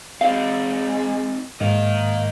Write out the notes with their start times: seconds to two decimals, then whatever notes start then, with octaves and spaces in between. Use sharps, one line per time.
0.21 G#3 C4 D#4 F5
1.61 G#2 A#3 A#4 D#5